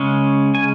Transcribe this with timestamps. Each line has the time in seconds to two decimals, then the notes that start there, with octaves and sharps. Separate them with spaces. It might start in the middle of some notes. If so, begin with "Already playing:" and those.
Already playing: C#3 G#3 C#4
0.55 G#5